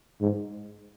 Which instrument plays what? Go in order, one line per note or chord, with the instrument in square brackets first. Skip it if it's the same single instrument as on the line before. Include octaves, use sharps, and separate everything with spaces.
[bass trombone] G#2